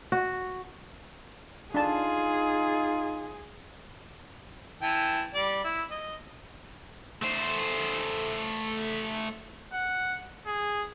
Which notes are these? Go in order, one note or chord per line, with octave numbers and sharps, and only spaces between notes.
F#4
D4 D#4 F4 G#4 A5
E3 G5 A5
G3 D5
E4
D#5
A3 C5
F#5
G#4